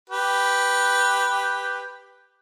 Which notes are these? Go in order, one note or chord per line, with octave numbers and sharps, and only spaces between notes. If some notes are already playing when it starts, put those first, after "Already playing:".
G4 B4